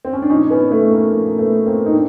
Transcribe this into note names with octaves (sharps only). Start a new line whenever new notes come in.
C4
C#4
D4
F3 C#4 D#4
A#2
B3 C#4
A3 B3
A#3
A#2 F3 A#3
A#3
A3 B3
A#3 C4
D#4
A2 C4 D4